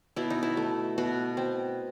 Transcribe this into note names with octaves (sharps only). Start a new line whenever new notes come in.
B2 E4
D#4
E4
A3
B2 F#4
C4